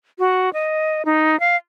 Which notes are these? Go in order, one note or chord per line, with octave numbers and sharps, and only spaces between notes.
F#4
D#5
D#4
F5